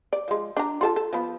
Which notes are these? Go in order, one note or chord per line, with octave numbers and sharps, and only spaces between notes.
D5
F3 G#3
D4 A#5
F4 A4 A5
A4
F3 B3